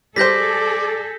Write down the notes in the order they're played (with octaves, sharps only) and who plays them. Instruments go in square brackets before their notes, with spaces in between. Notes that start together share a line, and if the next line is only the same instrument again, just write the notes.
[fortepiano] G3 C5 [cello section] G#4 A4 [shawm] D5 [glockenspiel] G6 A#6 B6